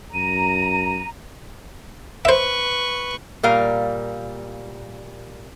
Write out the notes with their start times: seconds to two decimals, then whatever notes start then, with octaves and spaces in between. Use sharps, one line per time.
0.14 F#2 A#5 D#7
2.25 B4 C5 E5 C#6
3.43 A#2 G3 A#4 F5